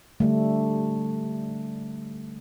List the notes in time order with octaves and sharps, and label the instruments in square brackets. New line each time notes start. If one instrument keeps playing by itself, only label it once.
[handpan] D3 G3 A3